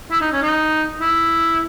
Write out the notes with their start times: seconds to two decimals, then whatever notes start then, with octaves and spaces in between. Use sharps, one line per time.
0.11 E4
0.20 D#4
0.32 C#4
0.41 D#4
1.00 E4